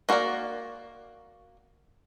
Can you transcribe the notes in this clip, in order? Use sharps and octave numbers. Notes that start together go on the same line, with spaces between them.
A#3 F#4 A#4 B4 D5